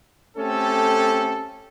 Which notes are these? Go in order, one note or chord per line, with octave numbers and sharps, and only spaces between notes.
A3 C4 C#4 G4 A4